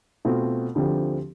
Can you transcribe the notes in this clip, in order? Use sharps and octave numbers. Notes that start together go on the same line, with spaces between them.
B2 A3 C4 F4
D2 D3 F3 C4 G4